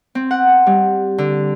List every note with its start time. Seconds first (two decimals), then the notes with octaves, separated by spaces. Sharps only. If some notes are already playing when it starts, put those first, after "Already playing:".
0.15 C4
0.31 F#5
0.67 G3
1.18 D3